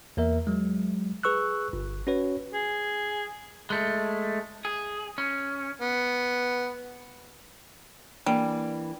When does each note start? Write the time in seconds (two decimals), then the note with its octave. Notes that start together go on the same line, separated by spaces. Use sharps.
0.17 E2 A#3 A#4 E5
0.47 F#3 G#3
1.23 G#4 B4 C#6 E6 F#6
1.73 G1
2.07 C#4 F#4 B4 C#5
2.54 G#4
3.70 G#3 A3
4.65 G#4
5.18 C#4
5.81 B3
8.26 E3 G3 A#3 D4